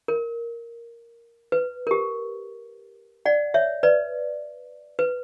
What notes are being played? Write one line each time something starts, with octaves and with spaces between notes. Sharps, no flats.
A#4
B4
A#4
G4
D5 F#5
C#5 E5
B4 D5
B4